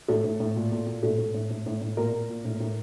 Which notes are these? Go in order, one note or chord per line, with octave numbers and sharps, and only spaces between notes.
A2 A4
A2
A2
A#2
A#2
A#2
A2 A4
A2
A2
A2
A2
A2
A#2 A#4
A#2
A#2
A2
A2